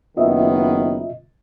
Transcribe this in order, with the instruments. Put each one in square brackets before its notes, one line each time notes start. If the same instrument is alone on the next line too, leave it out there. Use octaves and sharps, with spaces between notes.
[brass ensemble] F#1 D#3 B3 [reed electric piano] F4 D#5 E5